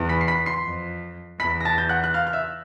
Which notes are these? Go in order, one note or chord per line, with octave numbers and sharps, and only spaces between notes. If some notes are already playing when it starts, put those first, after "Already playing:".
Already playing: E2
B5 B6
C7
B5 B6
C6 C7
F2
E2 B5 B6
A#6
A5 A6
G6
F#5 F#6
F#6
F5 F6
F6
E5 E6